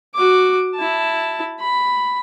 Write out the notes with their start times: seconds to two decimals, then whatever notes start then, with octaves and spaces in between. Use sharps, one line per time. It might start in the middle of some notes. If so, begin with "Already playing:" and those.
0.15 F#4 D6
0.75 E4 A5
1.60 B5